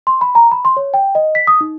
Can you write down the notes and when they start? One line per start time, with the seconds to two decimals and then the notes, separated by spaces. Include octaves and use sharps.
0.07 C6
0.21 B5
0.35 A#5
0.51 B5
0.65 C6
0.77 C#5
0.94 G5
1.15 D#5
1.35 B6
1.47 D#6
1.61 D#4